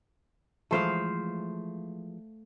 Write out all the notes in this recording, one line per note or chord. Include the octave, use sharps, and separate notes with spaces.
E3 F3 G#3 A3 C5 F5